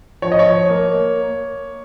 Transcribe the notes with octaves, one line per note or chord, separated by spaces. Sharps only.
F3 C#5
D#5
C#5
A#3